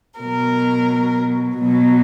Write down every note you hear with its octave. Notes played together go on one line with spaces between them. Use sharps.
B2 F#3 A#4
B2 F#3